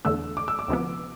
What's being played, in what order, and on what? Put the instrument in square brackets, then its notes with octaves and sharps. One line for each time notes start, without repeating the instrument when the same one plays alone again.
[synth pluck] E2 D3 A3 [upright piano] E6
[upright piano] D6
E6
D6
[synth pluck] D2 C3 F3 B3